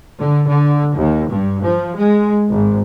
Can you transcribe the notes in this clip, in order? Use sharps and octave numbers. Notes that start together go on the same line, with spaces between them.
D3
D3
D#2
G2
F3
G#3
G#1